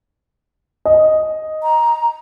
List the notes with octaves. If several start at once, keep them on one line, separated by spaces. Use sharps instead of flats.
D#5
A#5